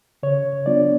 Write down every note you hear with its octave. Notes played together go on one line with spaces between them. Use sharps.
C#3 C#5
F#3 B3 D4 F4 D5